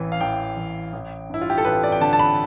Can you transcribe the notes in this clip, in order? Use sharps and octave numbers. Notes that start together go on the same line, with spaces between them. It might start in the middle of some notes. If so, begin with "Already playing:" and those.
Already playing: A1 E3
F5
A1 G5
A1
A1
G2 E4
F4
G4
A4
A1 B4
D5
G5
D3 A5
A5
B5